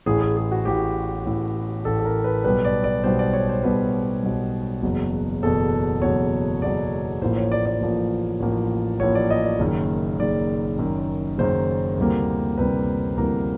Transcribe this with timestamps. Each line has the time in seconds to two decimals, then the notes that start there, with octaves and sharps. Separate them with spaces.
0.06 A1 A2 E3 G#4
0.21 G#4
0.37 G#4
0.52 F#4
0.65 A1 A2 E3 G4
1.26 A1 A2 E3
1.85 A1 A2 E3 A4
2.00 A4
2.05 A#4
2.24 B4
2.44 B1 B2 G3 B4
2.65 D5
2.84 D5
3.04 B1 B2 G3 C5
3.19 D5
3.33 C#5
3.49 C5
3.63 B1 B2 G3 B4
4.23 B1 B2 G3
4.82 F#1 E2 B2 F#3
5.43 F#1 E2 B2 F#3 A4
6.02 F#1 E2 B2 F#3 C#5
6.61 F#1 E2 B2 F#3 D5
7.21 A1 A2 F3 A#3 C5
7.37 C#5
7.52 D5
7.66 D5
7.81 A1 A2 F3 A#3
8.40 A1 A2 F3 A#3
8.99 A1 A2 F3 A#3 C#5
9.15 D5
9.30 D#5
9.44 D5
9.59 F#1 F#2 D#3
10.19 F#1 F#2 D#3 D5
10.78 F#1 F#2 D#3
11.38 F#1 F#2 D#3 C5
11.97 D2 C3 E3 G3 A#3
12.58 D2 C3 E3 G3 A#3 B4
13.17 D2 C3 E3 G3 A#3 A#4